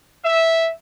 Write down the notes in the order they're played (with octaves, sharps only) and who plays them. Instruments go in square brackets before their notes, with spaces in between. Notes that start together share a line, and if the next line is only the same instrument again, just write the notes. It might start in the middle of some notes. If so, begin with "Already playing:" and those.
[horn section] E5